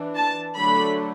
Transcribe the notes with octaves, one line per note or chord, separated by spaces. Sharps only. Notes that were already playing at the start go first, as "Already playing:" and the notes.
Already playing: E3 D4
A5
D3 F#3 A3 D4 B5